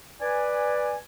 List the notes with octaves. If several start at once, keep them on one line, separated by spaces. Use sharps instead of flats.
B4 D5 G#5